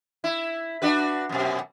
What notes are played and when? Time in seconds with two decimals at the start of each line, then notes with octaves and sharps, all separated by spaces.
0.24 E4
0.82 D4 F#4 B4
1.29 F#2 B2